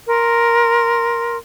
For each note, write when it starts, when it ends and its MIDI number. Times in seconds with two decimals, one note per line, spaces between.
0.07 1.37 70
0.07 1.37 84